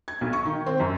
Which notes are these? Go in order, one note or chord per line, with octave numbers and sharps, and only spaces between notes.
G#6
B1
C#6
D#3
C4
F#2